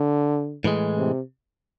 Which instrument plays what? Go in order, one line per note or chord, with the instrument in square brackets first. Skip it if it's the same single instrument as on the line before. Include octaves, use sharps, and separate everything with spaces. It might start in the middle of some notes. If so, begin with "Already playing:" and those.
Already playing: [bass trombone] D3
[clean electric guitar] A2 E3 G#3
[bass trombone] C3